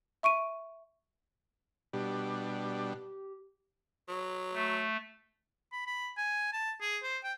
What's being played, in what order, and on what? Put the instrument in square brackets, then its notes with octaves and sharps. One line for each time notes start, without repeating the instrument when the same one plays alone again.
[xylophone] E5 C#6 D7 D#7
[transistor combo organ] B2 G3 D4 [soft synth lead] G4
[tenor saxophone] F#3
[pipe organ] A3
[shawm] B5
B5
G#5
A5
G#4
C5
G5